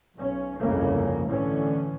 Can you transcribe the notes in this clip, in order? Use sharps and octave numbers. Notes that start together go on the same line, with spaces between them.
B1 C#4
G1 C2 F2 C#3 A#3 C#4
A2 D3 E3 C#4